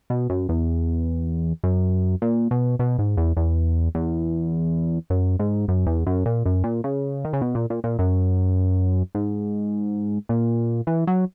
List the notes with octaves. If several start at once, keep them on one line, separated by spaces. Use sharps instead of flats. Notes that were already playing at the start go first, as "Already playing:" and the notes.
B2
F#2
E2
F#2
A#2
B2
B2
G#2
E2
E2
E2
F#2
G#2
F#2
E2
F#2
A#2
F#2
A#2
C#3
D#3
C#3
B2
A#2
A#2
A#2
F#2
G#2
A#2
E3
F#3